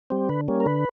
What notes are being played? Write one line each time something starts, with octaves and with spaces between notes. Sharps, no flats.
G3 C4
D3 B4
G3 A#3 C#4
A#4
D3 B4